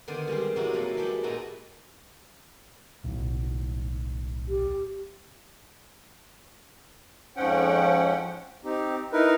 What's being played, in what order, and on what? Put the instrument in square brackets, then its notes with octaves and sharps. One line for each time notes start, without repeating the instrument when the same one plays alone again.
[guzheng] D3 D#3 B3 C5 D5
G3 G#3 C4 G4
G#2 C3 F#3 D#4 E4 F#4
F#3 A#3 A4 B4
G#3 G4 A4 G5 B5
A#2 D#4 F#4 B4 E5 A#5
[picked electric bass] D1 B1
[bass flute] G4
[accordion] F2 G#2 F3 C#4 F#5 G5
[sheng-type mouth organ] C4 D#4 G4
D#4 E4 A#4 B4